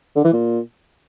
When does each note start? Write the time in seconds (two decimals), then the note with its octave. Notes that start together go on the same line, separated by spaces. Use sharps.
0.16 D3
0.24 E3
0.33 A#2